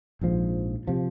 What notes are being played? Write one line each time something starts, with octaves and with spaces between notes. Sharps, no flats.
A#1 G#2 F3
C3 F3